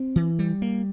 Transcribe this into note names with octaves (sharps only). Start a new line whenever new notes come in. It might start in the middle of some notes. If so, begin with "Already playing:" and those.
Already playing: C4
E3
G3
A#3